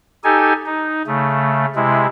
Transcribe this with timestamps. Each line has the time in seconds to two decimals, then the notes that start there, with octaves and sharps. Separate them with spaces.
0.24 D#4 G4 A4 G#5
0.66 D#4
1.07 C#3 A3
1.75 C3 G#3 E4